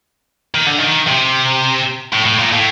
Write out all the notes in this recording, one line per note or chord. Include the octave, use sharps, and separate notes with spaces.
D#3
D3
D#3
C3
A2
A2
A#2
A2